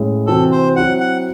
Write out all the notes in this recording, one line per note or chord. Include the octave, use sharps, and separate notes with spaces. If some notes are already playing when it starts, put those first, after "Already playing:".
Already playing: A2 G#3 C#4 E4 G#4
C3 E3 C4 F#4 A4
C5
F#3 C4 E4 C5 F#5
F#5